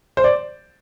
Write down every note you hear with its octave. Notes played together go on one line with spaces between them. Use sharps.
C5
D5